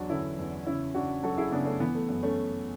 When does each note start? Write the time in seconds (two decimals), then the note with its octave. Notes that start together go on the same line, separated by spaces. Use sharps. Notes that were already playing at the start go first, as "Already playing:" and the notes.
Already playing: E2 F#3 D4 F#4
0.10 D3 C#4 E4
0.39 E2
0.66 C#3 C#4 E4
0.95 C#3 D4 F#4
1.23 F#3 F#4 A4
1.38 E4 G#4
1.52 C#3 B3 D4
1.66 A3 C#4
1.80 E3 B3
1.95 A3
2.09 F#2 B3
2.23 A3 C#4